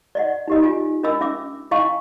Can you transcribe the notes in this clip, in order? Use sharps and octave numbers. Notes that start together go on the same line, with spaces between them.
D5 D#5 F#5
D#4 G4 D#5
F4 G#5
D4 A#4 D#5 B5 E6
C#4 E5 D6 E6
E4 D#5 F5 G5 G#5 C#6